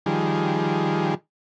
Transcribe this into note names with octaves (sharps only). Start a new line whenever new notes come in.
D#3 F3 G3 G#4